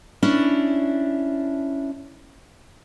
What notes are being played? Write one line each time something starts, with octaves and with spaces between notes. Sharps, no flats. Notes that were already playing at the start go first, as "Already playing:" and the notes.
C#4 D4 E4